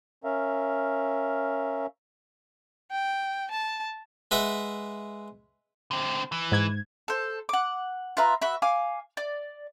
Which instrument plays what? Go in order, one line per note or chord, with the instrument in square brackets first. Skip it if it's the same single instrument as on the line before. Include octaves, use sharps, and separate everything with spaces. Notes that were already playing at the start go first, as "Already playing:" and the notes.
[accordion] C#4 A#4 E5 F5
[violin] G5
A5
[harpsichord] G#3 B4 E5 F#5
[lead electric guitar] D3 C4
E3
[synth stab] G#2 G#6
[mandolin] A4 C5
F#5 D6
F4 B4 E5 A#5
F#4 B4 E5
F5 G#5 D6
D5